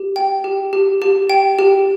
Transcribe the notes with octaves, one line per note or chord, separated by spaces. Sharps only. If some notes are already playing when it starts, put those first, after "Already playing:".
Already playing: G4
G5
G4
G4
G4
G5
G4